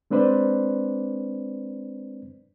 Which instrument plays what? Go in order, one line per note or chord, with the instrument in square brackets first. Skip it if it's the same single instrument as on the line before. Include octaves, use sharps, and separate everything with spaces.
[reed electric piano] G#3 C4 D4 B4 C5 D5